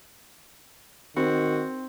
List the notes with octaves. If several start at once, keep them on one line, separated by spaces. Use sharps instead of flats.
D#3 C4 F#4